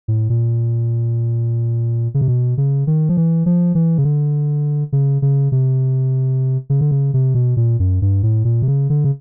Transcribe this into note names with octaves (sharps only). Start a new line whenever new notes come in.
A2
A#2
C#3
C3
B2
C#3
D#3
F3
E3
F3
E3
C#3
D3
C#3
C#3
C3
C#3
D3
C#3
C3
B2
A#2
F#2
G2
A2
A#2
C3
C#3
D3
C#3